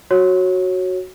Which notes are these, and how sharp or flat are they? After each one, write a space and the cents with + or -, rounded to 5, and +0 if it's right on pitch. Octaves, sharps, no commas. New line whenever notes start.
F#4 +0 C#5 -20